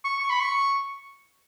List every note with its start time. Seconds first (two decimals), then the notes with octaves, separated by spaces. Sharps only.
0.05 C#6
0.20 C#6
0.29 B5
0.40 C#6